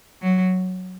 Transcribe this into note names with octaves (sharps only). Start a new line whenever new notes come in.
F#3